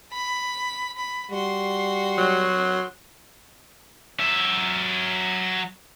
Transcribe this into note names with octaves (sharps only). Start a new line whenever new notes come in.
B5
B5
G3 F#4 C6
F#3
F#3 E5